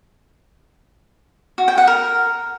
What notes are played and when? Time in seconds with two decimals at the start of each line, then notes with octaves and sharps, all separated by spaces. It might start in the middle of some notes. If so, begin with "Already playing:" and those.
1.58 F#4
1.68 G5
1.78 F#5
1.87 A#4